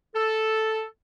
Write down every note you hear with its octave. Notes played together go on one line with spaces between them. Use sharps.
A4